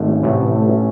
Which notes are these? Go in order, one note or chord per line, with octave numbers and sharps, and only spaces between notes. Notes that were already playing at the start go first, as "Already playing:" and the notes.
Already playing: G#1 A3
C#4
A1 A2 C3
E3
A3
C#4